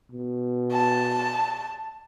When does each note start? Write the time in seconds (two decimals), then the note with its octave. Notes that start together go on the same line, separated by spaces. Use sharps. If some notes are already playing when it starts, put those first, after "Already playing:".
0.11 B2
0.72 A5